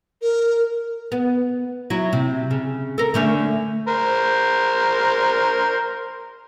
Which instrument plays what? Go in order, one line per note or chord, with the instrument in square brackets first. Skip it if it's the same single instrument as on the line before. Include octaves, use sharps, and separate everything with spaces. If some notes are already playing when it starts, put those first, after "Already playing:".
[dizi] A#4
[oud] B3
F#3 E4
C3
C#3
A4 A#4
D3 A3 C#4
[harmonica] A#4 C5